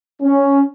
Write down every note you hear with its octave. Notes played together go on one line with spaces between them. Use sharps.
C#4